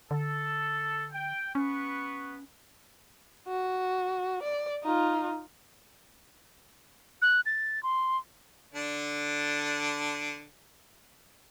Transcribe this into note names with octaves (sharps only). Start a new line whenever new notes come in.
D3 A4
G5
B3 C#4 B4 C#6
F#4
D5
D#4 F4
F#6
A6
C6
D3 D4